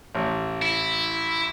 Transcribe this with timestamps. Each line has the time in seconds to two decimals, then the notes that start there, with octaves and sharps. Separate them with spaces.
0.15 A1
0.62 E4